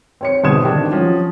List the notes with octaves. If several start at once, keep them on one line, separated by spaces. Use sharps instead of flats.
C4 C#5 C#7
G#1 B2 D#6 G#6 E7
G#1 D#3 D4 G4
F3 F#3 C#4